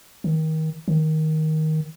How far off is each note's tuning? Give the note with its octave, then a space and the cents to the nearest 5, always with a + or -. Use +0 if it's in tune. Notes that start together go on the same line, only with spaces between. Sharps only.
D#3 +25
D#3 +10